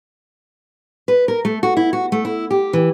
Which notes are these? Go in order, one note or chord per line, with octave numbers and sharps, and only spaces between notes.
B4
A#4
A3
F#4
E4
F#4
A3
E4
G4
E3